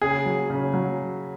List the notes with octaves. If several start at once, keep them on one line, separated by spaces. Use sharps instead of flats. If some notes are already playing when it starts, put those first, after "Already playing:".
C#3 G#4
F#3
C#3
F#3